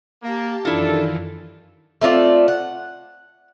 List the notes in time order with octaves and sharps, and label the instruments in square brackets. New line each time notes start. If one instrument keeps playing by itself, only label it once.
[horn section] A#3 [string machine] G4 A5
[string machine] F#2 D#3 E3 [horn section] D4 A4 [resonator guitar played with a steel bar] E4 F4
[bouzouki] A3 C4 F4 D5
F#5